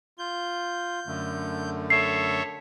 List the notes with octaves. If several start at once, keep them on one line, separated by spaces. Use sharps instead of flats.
F4 G6
F#2 D3 A3
A4 C#5 E5 C7